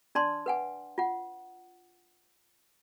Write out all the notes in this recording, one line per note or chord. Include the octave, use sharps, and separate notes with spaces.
D4 D5 A5 C6
B4 F#5 G#5
F4 F#5